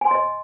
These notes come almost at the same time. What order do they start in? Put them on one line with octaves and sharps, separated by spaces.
G#5 C6 D#5